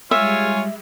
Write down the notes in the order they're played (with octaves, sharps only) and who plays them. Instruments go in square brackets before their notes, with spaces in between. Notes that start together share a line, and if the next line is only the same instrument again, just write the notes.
[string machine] G3 G#3 [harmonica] F4 C#5 G#5 [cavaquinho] E5